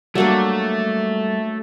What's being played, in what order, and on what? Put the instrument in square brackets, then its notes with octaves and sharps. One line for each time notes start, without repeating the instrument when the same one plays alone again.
[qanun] F#3 A#3 D4 [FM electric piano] G3 [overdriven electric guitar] A3